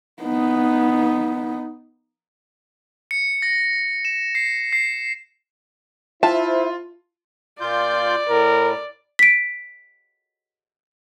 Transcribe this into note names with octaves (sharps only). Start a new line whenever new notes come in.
B3 D#4
C#7
A#6
E7
C7
C7
E4 F4 C5 E5 A5
A#2 F4 D5 G6
A2 A#4
B6 D7